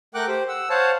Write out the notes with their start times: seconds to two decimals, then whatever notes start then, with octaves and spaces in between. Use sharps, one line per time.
0.15 A3 A#4 F#5 G5 D6 F#6
0.28 G4 C5
0.48 F#5 E6
0.70 C5 C#5 F5 F#5 A5